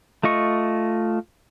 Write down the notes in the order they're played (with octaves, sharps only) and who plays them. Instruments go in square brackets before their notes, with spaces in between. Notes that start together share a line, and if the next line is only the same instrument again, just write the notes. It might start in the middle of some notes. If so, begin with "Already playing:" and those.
[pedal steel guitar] A3 F4 D#5 C#6